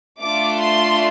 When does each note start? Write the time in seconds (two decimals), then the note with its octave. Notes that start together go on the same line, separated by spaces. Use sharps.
0.20 A3 D4 F4 D6
0.60 C6